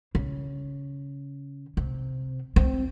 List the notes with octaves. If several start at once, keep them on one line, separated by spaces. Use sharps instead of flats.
C#3
C3
C4